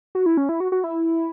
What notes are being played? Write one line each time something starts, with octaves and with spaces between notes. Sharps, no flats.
F#4
E4
C#4
E4
F#4
F#4
E4